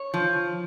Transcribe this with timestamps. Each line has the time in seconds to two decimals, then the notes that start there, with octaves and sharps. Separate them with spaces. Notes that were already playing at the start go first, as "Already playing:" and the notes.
Already playing: C#5
0.14 F3